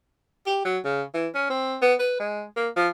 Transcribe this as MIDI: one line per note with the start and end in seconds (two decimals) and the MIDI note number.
0.46 0.62 67
0.65 0.78 54
0.84 1.02 49
1.14 1.28 52
1.35 1.46 61
1.50 1.76 60
1.82 1.94 59
1.99 2.19 71
2.20 2.43 56
2.56 2.68 58
2.76 2.89 53